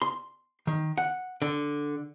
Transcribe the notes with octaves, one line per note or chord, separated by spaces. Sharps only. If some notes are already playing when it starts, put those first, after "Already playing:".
C6
D#3
F#5
D3